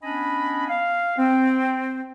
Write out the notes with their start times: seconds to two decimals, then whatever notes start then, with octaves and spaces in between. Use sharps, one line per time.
0.03 B3 C#4 D4 D#5 G#5 B5
0.69 F5
1.18 C4